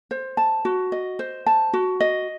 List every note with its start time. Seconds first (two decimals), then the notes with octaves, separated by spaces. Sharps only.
0.11 C5
0.37 A5
0.65 F#4
0.92 D#5
1.19 C5
1.46 A5
1.73 F#4
2.00 D#5